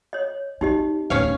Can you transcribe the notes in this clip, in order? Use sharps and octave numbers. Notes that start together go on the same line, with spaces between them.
C#5 D#5
C4 D#4 G4 D#5
D1 D#3 C#4 B4 C#5 F5